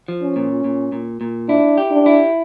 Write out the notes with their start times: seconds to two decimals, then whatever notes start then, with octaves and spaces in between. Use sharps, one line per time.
0.08 F3
0.22 C#4
0.36 A#2
0.64 A#2
0.92 A#2
1.21 A#2
1.49 D4 E4
1.78 G4
1.91 D4
2.06 E4